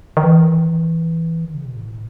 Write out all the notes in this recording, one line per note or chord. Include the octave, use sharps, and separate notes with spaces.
D#3
E3
D#3
C#3
B2
A2